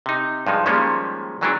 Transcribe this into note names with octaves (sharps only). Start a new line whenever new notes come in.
C3 D#4
G2 F3 G#3 D#4
D#3 F3 G3 G#3 A#3 C#4
D#3 E3 F#3 G#3 C#4 D4